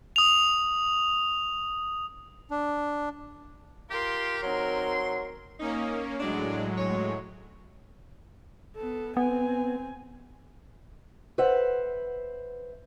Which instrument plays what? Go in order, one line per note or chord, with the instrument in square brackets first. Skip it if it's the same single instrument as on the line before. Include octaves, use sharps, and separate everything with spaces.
[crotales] D#6 F7
[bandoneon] D4
[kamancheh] F4 C6 [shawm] G4 [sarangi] A#4
[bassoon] F#3 [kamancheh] C4 D#4 [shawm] C6
[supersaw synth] A#3 C#4 [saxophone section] D#4
[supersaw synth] A2 F#3 G#3 [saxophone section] D4
[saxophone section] C#5
[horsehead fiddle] B3 A4
[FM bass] B3 [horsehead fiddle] C4 G#5
[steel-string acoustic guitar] B4 C5 E5 F#5